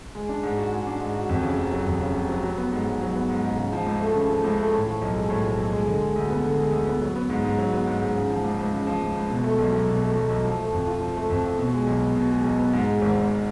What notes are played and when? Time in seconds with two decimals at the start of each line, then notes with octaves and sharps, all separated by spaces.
0.15 G#3
0.29 D4
0.43 G#2
0.58 F#4
0.72 G#3
0.87 D4
1.00 G#2
1.15 F#4
1.29 F2
1.43 C#3
1.57 F1
1.72 F#3
1.86 F2
2.00 C#3
2.15 F1
2.29 F#3
2.43 F#3
2.58 B3
2.72 G#2
2.87 G#2
3.01 F#3
3.15 B3
3.30 G#2
3.44 G#2
3.58 C#3
3.73 F3
3.87 C#2
4.01 A3
4.15 C#3
4.30 F3
4.44 C#2
4.58 A3
4.73 A2
4.87 F3
5.02 B1
5.15 G#3
5.30 A2
5.44 F3
5.58 B1
5.73 G#3
5.86 D3
6.01 G#3
6.15 D2
6.30 B3
6.44 D3
6.58 G#3
6.73 D2
6.87 B3
7.02 F#3
7.16 B3
7.30 G#2
7.44 G#2
7.59 F#3
7.72 B3
7.87 G#2
8.01 G#2
8.15 C#3
8.30 F3
8.44 C#2
8.59 C#2
8.73 C#3
8.87 F3
9.02 C#2
9.16 C#2
9.30 B2
9.44 A3
9.59 B1
9.73 B1
9.87 B2
10.02 A3
10.16 B1
10.30 B1
10.45 F3
10.59 A3
10.73 F2
10.87 F4
11.02 F3
11.16 A3
11.30 F2
11.44 F4
11.59 B2
11.73 G#3
11.87 B1
12.02 B3
12.16 B2
12.31 G#3
12.44 B1
12.59 B3
12.73 G#2
12.87 G#3
13.01 G#1
13.16 G#1